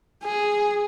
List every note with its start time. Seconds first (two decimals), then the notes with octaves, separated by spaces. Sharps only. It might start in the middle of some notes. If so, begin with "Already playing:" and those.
0.23 G#4